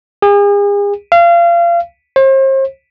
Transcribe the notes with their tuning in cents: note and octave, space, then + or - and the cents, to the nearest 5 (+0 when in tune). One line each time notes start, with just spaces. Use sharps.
G#4 -40
F5 -30
C5 +40